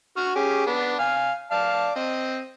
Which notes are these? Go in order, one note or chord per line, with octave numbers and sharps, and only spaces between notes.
F#4 C#6 F6
C#4 G4 G#4
B3 D4
F5 G#5
D5 F5 A5
C4 D#5